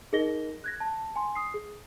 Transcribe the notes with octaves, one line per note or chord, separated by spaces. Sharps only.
D#4 G#4 A#4 D#5 A#6 G7
F#6 G#6 A#6
A5
G#5 C6
D#6 C7
G#4